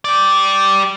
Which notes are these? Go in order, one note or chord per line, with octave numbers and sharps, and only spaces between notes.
G4 D5